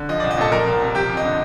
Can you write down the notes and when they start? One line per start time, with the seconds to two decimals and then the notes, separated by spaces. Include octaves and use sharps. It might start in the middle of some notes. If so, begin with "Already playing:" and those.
Already playing: D3
0.09 F3 D#5
0.20 C2 D5
0.31 D#5
0.37 A#2 A4 A5
0.52 F3 A#4 A#5
0.66 C2
0.81 C3
0.95 F3 G4 G5
1.10 F2
1.17 D#5
1.24 D3